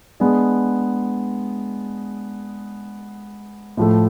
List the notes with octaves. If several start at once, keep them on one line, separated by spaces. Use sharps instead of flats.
G#3 B3 D4 G#4
A2 F3 A3